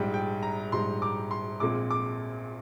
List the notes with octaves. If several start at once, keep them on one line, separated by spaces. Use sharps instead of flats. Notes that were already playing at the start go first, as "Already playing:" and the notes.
Already playing: A#1 G#2 G3 G5
G5
A#5
A#1 G#2 G3 C6
D6
C6
A#1 A#2 G#3 C4 D6
D6